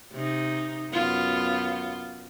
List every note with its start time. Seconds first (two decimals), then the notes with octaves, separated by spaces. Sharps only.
0.13 C3 D#4
0.91 F#2 B3 F4